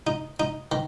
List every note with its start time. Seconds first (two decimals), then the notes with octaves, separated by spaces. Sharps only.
0.07 D#4
0.40 D#4
0.72 D#3